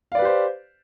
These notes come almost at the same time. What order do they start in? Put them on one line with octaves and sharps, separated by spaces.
F5 D5 B4 G4 C5